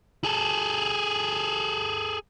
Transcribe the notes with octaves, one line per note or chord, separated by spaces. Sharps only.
G#4 A4